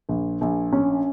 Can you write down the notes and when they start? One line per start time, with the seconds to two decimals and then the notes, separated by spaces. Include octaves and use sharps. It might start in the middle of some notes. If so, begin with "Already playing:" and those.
0.09 A#1
0.41 A#1
0.73 C#4